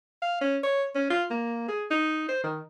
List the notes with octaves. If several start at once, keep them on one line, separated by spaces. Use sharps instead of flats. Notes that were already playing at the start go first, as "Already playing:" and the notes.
F5
C#4
C#5
C#4
F4
A#3
G#4
D#4
C5
D#3